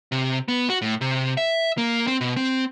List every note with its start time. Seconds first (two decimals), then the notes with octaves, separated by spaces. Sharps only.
0.12 C3
0.48 B3
0.70 F#4
0.82 A2
1.01 C3
1.37 E5
1.78 A#3
2.07 C4
2.21 B2
2.37 C4